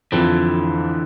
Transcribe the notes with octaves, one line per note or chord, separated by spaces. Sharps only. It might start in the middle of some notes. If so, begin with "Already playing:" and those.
F2 D3 E3